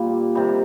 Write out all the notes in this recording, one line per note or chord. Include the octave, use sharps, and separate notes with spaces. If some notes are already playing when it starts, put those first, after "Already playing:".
Already playing: A#2 G3 A#3
C3 D#3 G3